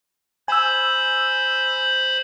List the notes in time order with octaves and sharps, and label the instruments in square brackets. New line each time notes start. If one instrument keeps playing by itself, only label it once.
[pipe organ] C5 B5 [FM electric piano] G#5 E6